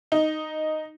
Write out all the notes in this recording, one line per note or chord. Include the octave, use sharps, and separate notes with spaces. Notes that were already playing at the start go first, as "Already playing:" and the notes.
D#4